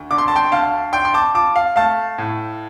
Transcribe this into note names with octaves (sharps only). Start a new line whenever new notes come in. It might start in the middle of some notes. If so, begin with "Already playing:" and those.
Already playing: D2
D3 D6
C6
A5
G5 C6
D2 F5 A5
D4 G5 C6
C6
A5 D6
F4 A5 D6
F5
A3 F5 A5
A2